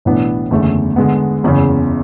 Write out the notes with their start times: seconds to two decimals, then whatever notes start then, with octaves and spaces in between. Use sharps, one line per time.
0.05 B1 A2 E3 B3 D4
0.51 F#1 E2 D3 A3
0.96 D3 G#3 B3
1.43 F#1 E2 C#3